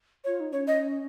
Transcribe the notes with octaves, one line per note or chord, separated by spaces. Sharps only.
F4 C#5
D#4
C#4 C#5
D#5